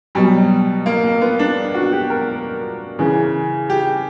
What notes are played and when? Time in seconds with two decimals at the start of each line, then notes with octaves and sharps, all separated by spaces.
0.15 B2 F#3 G3
0.86 A#3
1.04 A#3
1.21 B3
1.39 D4
1.74 F#4
1.92 G4
2.10 A#4
2.99 C#3 E3
3.70 G4